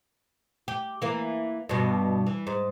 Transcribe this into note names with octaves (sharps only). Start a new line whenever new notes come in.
G4
E3 A#3
G2 B2
E3
G#2